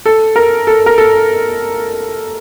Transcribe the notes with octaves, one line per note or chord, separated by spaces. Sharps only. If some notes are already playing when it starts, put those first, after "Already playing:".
A4
A#4
A4
A#4
A4